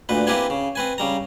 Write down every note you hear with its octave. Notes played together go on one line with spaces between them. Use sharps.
D2 A#2 B4
A#3 C4 E4 G4 B4 G#5
C#3
C4 B4 G#5
C#3 G3 A#5